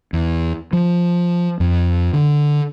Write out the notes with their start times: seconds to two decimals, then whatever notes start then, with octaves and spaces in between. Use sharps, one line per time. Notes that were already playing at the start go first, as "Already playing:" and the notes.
0.13 E2
0.73 F3
1.60 F2
2.13 D3